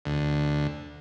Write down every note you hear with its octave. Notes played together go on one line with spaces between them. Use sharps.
D2